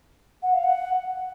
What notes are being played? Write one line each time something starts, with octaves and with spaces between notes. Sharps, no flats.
F#5
F5
F#5